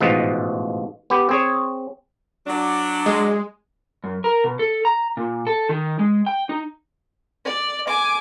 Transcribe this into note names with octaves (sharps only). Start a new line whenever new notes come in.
A1 G#2 B2 F3
B3 G4
C4 G#4 C#5
F#3 D4
G#3
F#2
A#4
B2
A4
A#5
A#2
A4
D#3
G#3
G5
D#4
D5
G#5 D6